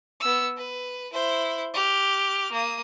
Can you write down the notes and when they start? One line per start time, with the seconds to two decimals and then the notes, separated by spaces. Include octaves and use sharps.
0.20 B3 E6
0.57 B4
1.13 E4 C5
1.74 G4 F6
2.52 A#3 D#6